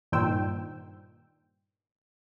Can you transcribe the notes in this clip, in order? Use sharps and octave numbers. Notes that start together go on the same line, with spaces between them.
G2 A#2 D#3 C5 G5 E6